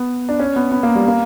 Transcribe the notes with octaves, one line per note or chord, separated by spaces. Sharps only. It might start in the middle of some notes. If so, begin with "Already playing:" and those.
Already playing: B3
D4
C#4
B3
B3
A#3
G3
A#3